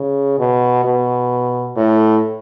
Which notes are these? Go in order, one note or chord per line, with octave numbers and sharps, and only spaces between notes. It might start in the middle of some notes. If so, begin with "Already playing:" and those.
Already playing: C#3
B2
B2
A2